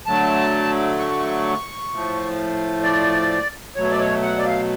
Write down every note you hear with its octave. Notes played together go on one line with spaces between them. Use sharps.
D3 F#3 A3 A5
C#6
A2 F3 A3
D5
B2 F#3 A3 C#5
D5
C#5
F#5
D5
F5